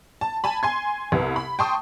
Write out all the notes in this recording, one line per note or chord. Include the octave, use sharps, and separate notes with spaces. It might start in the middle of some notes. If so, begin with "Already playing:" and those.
A5
G#5 A5 B5
G#5 C6 G#6
C2 C3 B3
B5
G5 A5 C6 C#6 D#6